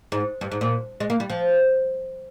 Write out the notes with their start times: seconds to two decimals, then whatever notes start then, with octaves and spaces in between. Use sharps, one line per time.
0.12 G#2
0.41 G2
0.52 G#2
0.61 A#2
1.00 G#3
1.10 A#3
1.20 G3
1.30 F3